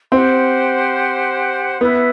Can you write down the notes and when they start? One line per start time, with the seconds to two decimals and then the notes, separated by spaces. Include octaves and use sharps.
0.12 C4 G4 C5 F#5 C6
1.81 B3 E4 B4 E5